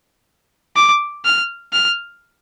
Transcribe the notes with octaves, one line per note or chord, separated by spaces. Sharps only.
D6
F6
F6